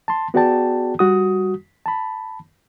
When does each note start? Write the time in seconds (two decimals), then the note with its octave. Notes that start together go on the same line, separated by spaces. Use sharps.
0.08 A5 C6
0.34 B3 F#4 G#4 D5 G5 A5
0.99 G3 F#4 D#6
1.86 A5 B5